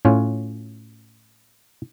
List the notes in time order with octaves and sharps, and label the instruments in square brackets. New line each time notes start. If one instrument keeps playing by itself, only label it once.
[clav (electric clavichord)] A2 C#4 F4